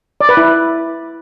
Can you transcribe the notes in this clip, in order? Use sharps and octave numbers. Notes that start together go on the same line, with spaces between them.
D5
B4
E4